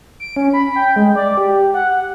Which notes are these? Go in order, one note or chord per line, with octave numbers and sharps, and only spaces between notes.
D7
C#4
B5
G5
G#3
D5
G4
F#5